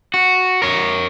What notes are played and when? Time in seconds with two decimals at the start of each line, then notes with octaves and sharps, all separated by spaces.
0.14 F#4
0.62 A#4 C#5